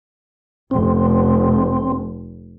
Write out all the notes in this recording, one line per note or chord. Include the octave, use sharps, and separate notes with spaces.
F1 C4